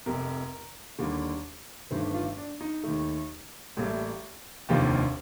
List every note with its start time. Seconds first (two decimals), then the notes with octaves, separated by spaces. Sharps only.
0.06 F1 F2 C3 A#4
0.99 D#2 D3 G3 A#3
1.91 G1 G2 D#3 A3 C5
2.14 F4
2.37 D4
2.61 D#4
2.83 D#2 D#3 A3
3.77 A1 A2 G3 A#3
4.69 F1 D#2 D3 F3 A#3 G4